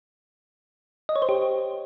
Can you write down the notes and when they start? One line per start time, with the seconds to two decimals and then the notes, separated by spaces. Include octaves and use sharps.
1.09 D#5
1.16 C#5
1.22 C5
1.29 G4